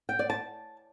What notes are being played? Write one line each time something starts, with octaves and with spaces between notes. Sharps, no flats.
G5
D5
A5